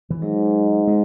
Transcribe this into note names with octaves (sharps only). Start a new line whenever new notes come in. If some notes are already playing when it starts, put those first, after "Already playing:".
E3
G#2 F#3
G#3